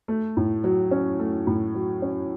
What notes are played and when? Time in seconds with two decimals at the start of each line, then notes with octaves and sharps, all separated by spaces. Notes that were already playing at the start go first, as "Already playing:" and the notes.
0.08 A3
0.37 A2
0.64 F#3
0.91 C#4
1.19 A3
1.47 A2
1.75 F#3
2.02 C#4